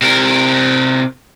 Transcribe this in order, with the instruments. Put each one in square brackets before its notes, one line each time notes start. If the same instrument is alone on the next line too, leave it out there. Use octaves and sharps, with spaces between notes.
[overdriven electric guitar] C3 A#4